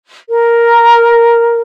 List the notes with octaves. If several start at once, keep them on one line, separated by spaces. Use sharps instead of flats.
A#4